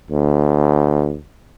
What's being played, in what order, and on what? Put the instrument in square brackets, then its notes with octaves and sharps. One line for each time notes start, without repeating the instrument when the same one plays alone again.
[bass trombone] D2